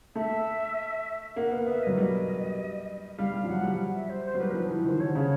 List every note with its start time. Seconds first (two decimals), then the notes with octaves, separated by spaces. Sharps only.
0.15 A3 E5
1.36 A#3 F#5
1.51 B3 F5
1.66 B3 E5
1.83 F#3 D#5
1.97 G3 D#5
3.18 G3 F5
3.33 G3
3.43 F3
3.49 F#3 F#5
3.63 G3
3.94 E5
4.09 C5
4.25 C5
4.35 F#3
4.39 G3 B4
4.50 A#4
4.54 F3 B4
4.69 E3
4.84 D#3 C5
5.00 D3 C#5
5.15 C#3